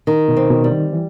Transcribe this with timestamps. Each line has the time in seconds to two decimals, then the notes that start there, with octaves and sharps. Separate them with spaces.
0.07 D#3
0.28 B2
0.37 C4
0.50 B2
0.64 G3
0.71 D#3
0.93 E3